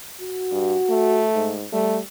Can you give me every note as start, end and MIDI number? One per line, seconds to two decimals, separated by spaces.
0.21 1.27 66
0.52 0.76 43
0.90 1.55 57
1.35 1.65 44
1.73 2.02 55
1.73 1.97 57